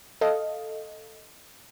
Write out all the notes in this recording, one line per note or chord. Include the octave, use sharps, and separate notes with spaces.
A4 D#5 F5